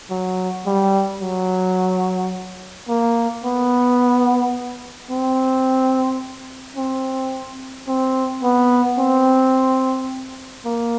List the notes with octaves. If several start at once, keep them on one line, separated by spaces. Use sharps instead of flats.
F#3
G3
F#3
A#3
B3
C4
C4
C4
B3
C4
A#3